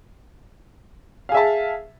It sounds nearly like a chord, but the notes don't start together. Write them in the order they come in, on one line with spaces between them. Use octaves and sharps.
F5 G#4 E5 A5